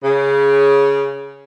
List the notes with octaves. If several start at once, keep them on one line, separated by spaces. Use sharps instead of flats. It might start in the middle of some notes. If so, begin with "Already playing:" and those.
C#3